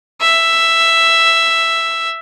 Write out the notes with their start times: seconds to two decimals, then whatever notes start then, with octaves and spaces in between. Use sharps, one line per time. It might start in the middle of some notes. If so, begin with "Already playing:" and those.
0.21 E5